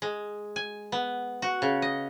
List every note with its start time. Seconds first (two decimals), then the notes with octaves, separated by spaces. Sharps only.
0.02 G#3
0.56 G#5
0.92 B3
1.42 F#4
1.62 C#3
1.82 D#5